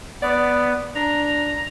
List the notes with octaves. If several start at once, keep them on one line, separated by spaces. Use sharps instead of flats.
B3 D5
D4 A#5